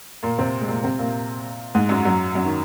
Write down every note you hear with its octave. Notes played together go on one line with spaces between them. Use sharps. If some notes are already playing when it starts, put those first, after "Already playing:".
A#2 A#3
C3 C4
G#3
A#2 A#3
C3 C4
A#2 A#3
G#2 G#3
F#2 F#3
F#2 F#3
F#2 F#3
D#3